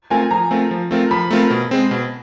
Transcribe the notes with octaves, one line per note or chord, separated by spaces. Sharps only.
A3 C4 F4 A#4 G#5
F3 A#5
A3 C4 F4 A#4
F3
A3 C4 F4 A#4
F3 B5
A3 C4 F4 A#4
B2
G#3 C4
B2